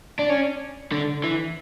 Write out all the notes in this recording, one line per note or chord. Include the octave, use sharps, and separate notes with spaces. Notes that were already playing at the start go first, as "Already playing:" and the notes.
D4
C#4
D3
E3